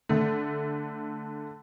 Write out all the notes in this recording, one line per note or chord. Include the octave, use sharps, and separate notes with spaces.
D3 A3